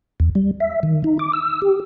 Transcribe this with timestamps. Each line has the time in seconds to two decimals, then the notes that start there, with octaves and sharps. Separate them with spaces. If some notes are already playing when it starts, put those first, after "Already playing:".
0.20 E2
0.35 G3
0.60 E5
0.83 D#3
1.04 D#4
1.19 D6
1.33 E6
1.62 G4